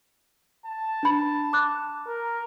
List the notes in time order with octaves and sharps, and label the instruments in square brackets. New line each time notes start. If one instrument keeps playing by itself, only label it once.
[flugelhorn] A5
[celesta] D4 B5
D6 F#6
[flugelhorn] A#4